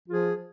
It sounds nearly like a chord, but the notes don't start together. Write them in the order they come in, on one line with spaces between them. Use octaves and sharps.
F3 F4 G#4